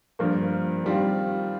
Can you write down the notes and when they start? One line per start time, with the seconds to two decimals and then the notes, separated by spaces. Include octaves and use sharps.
0.19 G2 F3 A#3
0.84 D#3 G3 C4 F4